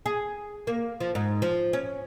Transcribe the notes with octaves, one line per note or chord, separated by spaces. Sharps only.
G#4
A#3
F3
G#2
F3
C#4